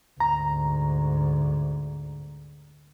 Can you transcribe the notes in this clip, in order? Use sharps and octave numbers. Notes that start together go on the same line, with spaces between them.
D2 G#2 A#5